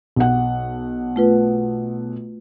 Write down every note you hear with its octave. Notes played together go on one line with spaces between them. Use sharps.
B1 F#5
A3 F4 B4